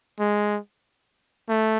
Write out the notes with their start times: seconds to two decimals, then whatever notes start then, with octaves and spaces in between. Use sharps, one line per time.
0.20 G#3
1.49 A3